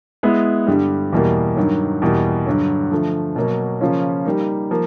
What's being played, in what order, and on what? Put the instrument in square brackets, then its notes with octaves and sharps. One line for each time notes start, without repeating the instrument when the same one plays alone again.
[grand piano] G#3 B3 E4
G2 D3 G3
E2 B2 G3 A#3
G2 D#3 F#3
E2 B2 G3 A#3
G2 D3 F#3
D3 F3 A3
B2 F#3 A#3
C#3 F3 A#3 C#4 F4
G3 A#3 D#4
F3 A#3